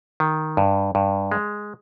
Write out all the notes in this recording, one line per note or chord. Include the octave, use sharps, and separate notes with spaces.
D#3
G2
G2
G#3